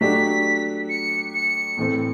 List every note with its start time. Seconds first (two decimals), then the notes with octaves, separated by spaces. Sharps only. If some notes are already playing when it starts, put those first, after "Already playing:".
0.01 F#3 A3 D4 G4 B6
0.89 C#7
1.34 C#7
1.77 A2 E3 A3 C4